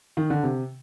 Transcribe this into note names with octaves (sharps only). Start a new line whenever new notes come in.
D#3
D3
C3